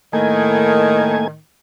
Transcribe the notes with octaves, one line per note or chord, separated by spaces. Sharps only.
A2 D#3 A3 A#3 G#5